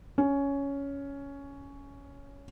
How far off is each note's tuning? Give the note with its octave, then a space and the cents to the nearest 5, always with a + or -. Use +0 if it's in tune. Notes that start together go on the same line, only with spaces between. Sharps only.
C#4 +10